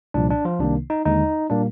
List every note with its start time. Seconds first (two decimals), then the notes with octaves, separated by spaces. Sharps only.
0.14 C2 A#2 F3 D4
0.30 D4
0.45 F3 F4
0.60 C2 C3 D#3 A#3 D4
0.90 D#4
1.05 D#2 D3 G#3 D#4
1.50 A#2 G3 A#3 D4